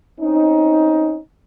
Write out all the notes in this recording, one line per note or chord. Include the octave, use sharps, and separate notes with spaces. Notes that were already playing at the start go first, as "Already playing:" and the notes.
C4 C#4 D#4